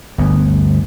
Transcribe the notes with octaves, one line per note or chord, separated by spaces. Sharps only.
G1 D2 B3